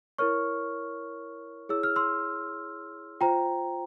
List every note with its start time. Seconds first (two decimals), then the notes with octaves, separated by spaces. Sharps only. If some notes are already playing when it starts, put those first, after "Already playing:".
0.18 E4 A#4 C#5 C#6 F6
1.69 E4 G#4 C#5 E6
1.83 F6
1.96 C6 E6
3.21 F4 C5 G5 A#5